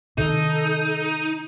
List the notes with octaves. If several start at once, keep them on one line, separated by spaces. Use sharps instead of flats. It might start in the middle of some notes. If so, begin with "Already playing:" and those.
C3 D#3 D#4 A4